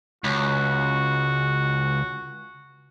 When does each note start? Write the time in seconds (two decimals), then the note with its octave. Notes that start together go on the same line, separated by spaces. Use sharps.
0.24 C#2 F#4